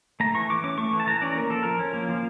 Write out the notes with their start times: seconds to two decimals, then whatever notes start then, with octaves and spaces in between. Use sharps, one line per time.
0.20 A3 A#5
0.35 E3 C#6
0.50 E3 D6
0.64 C#4 D6
0.78 A3 C#6
0.93 E3
1.00 A5
1.07 E3 A#5
1.22 C#4 D5
1.36 A#3 A#4
1.50 F3 A4
1.63 F3 A#4
1.79 C#4
1.94 A#3
2.09 F3